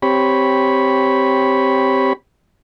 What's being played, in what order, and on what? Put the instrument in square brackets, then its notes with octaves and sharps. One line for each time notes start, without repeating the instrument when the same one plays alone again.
[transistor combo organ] C4 G4 C#5 B5